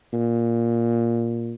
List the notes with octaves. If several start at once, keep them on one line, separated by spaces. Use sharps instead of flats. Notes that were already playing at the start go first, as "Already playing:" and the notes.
A#2